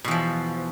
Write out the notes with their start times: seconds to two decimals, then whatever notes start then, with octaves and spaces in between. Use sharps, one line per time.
0.04 B2
0.08 E2
0.11 F3